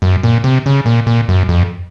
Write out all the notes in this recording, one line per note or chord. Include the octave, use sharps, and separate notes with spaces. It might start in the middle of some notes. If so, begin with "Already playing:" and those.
F#2
A#2
C3
C#3
A#2
A#2
F#2
F2